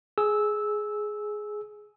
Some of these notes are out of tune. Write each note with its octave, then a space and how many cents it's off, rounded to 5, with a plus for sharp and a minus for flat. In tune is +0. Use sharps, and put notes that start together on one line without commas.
G#4 +10 E6 -10